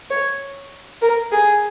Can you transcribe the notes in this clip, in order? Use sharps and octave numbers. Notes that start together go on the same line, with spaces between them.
C#5
A#4
G#4